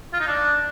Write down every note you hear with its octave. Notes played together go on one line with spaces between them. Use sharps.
F4
D#4
D4